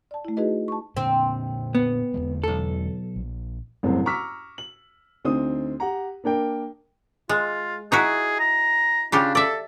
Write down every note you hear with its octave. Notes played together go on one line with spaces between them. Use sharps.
D5 A5
A3 E4
D#4 F#4 G#4 B4 D#5
A5 C#6
A#2 D3 C4
B3
E2 D3 G#3
B1 A4
A#1
F#1 C2 A2 C4
A#5 C#6 D6 E6 F6 B6
F#7
D2 C4 D#4 D#6
G4 F#5 A#5
A#3 D4 A#4 G5
G#3 F4
D#4 E4 F#4 G#4
A#5
C#3 D4 F4 G4
A4 D5 E5